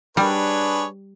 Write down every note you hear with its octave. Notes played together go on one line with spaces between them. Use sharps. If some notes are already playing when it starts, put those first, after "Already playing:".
G3 D4 G#4 B4 C#5